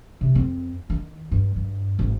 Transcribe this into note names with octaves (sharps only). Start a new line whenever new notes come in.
C3
F2 C4
D#3
G2
G2
G#1